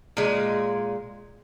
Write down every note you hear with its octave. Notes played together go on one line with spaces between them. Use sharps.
A#2 G#3